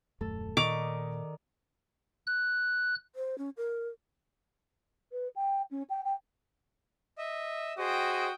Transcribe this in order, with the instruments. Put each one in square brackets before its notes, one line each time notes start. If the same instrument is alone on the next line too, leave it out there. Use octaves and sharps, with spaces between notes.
[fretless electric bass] D#1 F#2 A3 [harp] A4
[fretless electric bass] A#2 [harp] D#3 D5 [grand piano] D#5 C#6 F7 [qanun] D6
[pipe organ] F#6
[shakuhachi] C5
C#4
A#4
[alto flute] B4
G5
C#4
G5
G5
[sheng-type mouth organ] D#5 E5
[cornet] F#4 [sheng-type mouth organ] G#4 C5 D#5 [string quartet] G5 D#6